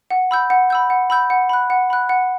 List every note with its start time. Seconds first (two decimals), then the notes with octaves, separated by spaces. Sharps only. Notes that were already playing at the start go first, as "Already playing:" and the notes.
0.10 F#5
0.31 B5 E6 G6
0.50 F#5
0.70 B5 E6 G6
0.90 F#5
1.10 B5 E6 G6
1.30 F#5
1.49 B5 F#6
1.70 F#5
1.90 B5 F#6
2.09 F#5